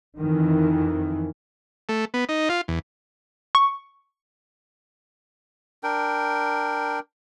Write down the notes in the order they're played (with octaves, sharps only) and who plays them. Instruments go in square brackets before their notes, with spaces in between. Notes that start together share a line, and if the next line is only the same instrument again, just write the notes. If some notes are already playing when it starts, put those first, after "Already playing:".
[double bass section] F2 D#3 E3
[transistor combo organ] A3
B3
D#4
F4
E2
[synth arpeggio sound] C#6
[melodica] D4 A#4 G5